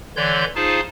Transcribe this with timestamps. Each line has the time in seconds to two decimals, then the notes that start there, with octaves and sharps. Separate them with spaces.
0.16 D3 E3 C#5 D5 C6 G6
0.56 D#4 F4 G#4 C5 F5 A5